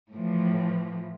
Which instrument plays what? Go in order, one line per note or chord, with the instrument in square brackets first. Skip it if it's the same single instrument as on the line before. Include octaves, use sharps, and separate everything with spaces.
[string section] A2 E3 F3